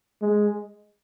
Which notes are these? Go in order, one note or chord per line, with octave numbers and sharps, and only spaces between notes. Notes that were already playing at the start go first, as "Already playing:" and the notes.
G#3